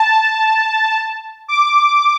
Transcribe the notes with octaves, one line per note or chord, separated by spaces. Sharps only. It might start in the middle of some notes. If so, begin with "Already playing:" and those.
Already playing: A5
D6